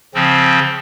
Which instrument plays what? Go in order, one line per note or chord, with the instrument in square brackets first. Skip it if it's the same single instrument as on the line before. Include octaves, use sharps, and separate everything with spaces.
[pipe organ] C#3 F3 C4